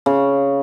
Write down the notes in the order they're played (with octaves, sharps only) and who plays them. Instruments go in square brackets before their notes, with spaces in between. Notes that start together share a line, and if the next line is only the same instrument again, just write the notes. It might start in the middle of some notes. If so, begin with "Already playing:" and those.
[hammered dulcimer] C#3